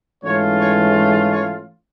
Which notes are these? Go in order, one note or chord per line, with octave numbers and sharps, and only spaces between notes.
G#2 E3 A3 C#4 F4 C#5
C#5
C#5